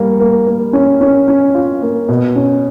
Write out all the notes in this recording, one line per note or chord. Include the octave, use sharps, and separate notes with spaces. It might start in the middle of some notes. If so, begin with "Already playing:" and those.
Already playing: G3 A#3
A#3
A#3
C#4
C#4
C#4
F4
A#3
B2
C#4